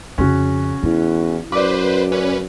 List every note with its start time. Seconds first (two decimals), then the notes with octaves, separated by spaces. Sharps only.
0.18 F2 C#3 C#4 F#4
0.83 E2 E4
1.52 F#2 B4 C5 D5 D6
2.12 C#4 B4